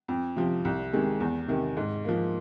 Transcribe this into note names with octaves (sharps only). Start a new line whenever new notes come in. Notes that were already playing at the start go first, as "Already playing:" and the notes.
F2
C3 F3
C2
C3 D#3 G#3
E2
C3 D#3
G#2
F3 A#3